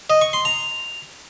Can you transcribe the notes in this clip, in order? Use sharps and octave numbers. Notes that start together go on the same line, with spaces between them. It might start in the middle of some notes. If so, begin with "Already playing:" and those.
D#5
C#6
C6
A#5